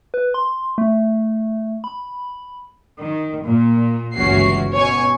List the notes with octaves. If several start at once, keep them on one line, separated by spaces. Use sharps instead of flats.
B4
C6
A3
B5
D#3
A#2
G1 C#2 E3 C#4 F#4 C7
B2 C#5 G#5 C#6